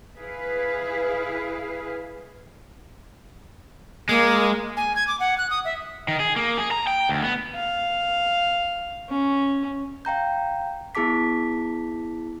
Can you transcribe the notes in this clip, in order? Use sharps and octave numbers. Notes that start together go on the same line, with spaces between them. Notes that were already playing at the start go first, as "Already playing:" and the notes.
E4 G#4 B4 F5
G#3 A#3
G#5
G#6
D6
F#5
F#6
D#6
E5
D#3
G#4
A#3
G#4
A#5
G5
D2
B3
F5
C#4
F5 G5 A#5 G6
B3 E4 G#4 A5 D6 B6